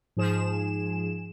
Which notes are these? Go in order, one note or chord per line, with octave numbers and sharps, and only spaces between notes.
G#2 F3 G#4 E7